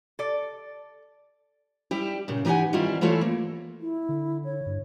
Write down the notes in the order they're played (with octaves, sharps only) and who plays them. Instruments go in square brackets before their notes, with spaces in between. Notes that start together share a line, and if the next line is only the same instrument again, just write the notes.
[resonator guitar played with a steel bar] A4 D5
[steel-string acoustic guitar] G3 E4 G4
A#2 C#3
E3 D#4 G4 D5 F#5 G#5
D#3 G3 C4 E4 F4
E3 A3 E4 F4 A4 C#5
A#3
[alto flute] E4
[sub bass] D3
[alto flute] C#5
[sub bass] G2